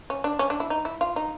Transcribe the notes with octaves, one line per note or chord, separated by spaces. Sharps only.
C#4
D4
C#4
D4
E4
D#4
E4
F4
D#4